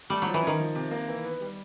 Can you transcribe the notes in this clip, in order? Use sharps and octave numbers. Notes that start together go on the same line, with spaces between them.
G3 A3
F#3
F3
E3
D#3 C#4
F3
C3
A#3
E3
B3
G3